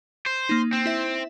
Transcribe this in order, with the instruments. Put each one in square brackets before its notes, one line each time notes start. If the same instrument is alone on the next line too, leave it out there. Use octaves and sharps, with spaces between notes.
[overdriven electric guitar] C5
[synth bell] A#3 D#4
[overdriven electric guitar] C4
[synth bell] E4 E5